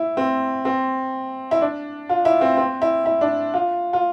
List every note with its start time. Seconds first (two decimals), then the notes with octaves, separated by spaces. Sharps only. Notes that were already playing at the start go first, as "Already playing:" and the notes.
Already playing: E4
0.17 C4
0.65 C4
1.51 E4
1.61 D4
2.09 F4
2.25 E4
2.41 C4
2.57 C4
2.82 E4
3.06 E4
3.21 D4
3.54 F4
3.93 F4